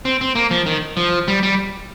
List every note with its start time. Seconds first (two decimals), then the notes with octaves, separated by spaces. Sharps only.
0.05 C4
0.21 C4
0.35 A#3
0.51 F3
0.66 D#3
0.97 F3
1.28 G3
1.43 G3